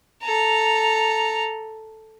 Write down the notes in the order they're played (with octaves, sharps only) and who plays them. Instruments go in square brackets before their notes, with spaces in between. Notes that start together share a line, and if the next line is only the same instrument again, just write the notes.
[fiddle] A4 A#5